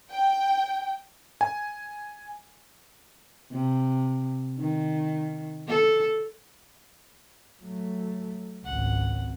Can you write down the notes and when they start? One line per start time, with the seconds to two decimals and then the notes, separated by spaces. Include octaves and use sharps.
0.11 G5
1.41 G#5
3.51 C3
4.59 D#3
5.68 A4
7.63 F#3 A3
8.64 G#1 C#2 F#5